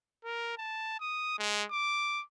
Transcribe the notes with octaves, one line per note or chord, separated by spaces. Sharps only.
A#4
A5
D#6
G#3
D6